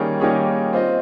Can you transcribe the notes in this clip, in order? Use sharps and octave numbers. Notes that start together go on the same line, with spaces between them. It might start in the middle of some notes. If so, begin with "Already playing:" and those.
Already playing: D#3 G3 A#3 C#4 G#4
D#3 G3 A#3 C#4 G#4
C4 F4 C5 D#5